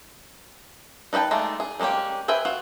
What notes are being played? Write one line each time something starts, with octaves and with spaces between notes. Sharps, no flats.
D#4 B4 D#5 G5 A5
G#3 A3 D4 D#4 F4
G#4
G3 G#3 A#3 C#4 G4
B4 C5 E5 G5 G#5
F4 F#4